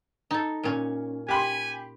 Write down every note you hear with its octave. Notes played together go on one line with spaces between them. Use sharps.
D#4 A4
A#2 C#4
G4 G#5 B5 C6